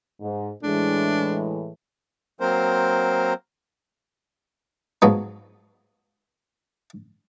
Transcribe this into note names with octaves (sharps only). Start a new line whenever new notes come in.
G#2
A2 E3 G#3 D4
F#3 A#3 C4 A#4 C5
G#2 F3 F#3 B3